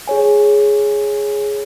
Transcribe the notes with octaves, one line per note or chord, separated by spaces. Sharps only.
G#4 C#5 G#5